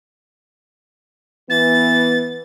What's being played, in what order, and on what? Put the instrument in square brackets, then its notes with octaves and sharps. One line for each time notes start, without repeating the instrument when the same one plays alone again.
[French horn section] E3 B3 [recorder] A6